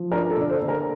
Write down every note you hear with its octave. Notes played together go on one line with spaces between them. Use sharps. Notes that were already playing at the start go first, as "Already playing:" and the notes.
Already playing: F3
D4 A#4
A4
D3 D5
A4 C5
D3
A#4